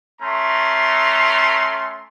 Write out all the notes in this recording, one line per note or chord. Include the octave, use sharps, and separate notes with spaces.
A3 C#4 A#5 C6